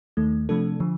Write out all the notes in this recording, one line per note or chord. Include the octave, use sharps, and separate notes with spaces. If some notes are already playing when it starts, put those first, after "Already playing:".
D#2 D#3 A3
C3 F3 A3 D4 A4
D3 F3